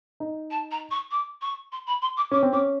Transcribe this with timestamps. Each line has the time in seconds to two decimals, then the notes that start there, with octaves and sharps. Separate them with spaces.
0.20 D#4
0.50 A5
0.71 A#5
0.90 C#6
1.11 D6
1.41 C#6
1.72 C6
1.86 B5
2.01 C6
2.16 D6
2.31 C#4 D6
2.43 C4
2.52 C#4 D6